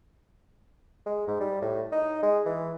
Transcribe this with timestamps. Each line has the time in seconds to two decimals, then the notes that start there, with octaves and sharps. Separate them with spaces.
1.06 G#3
1.27 G#2
1.40 G3
1.61 A2
1.92 D#4
2.23 G#3
2.45 E3